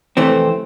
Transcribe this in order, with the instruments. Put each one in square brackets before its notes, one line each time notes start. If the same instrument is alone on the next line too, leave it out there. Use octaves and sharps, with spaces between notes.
[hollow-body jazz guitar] F2 C3 E3 A3 C4